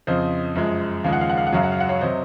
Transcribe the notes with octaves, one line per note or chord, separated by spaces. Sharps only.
F2 C#3 F3 C5 D#5
F#2 F3 G#3
D#2 C#3 F3 G#3 F5
F#5
F5
F#5
F5
F#5
F#2 C#3 F#3 F5
F#5
F5
F#5
C#5 F5
C3 F#3 C5 D#5